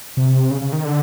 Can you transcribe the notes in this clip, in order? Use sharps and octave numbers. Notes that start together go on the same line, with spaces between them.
C3
C#3
C#3
D#3
D3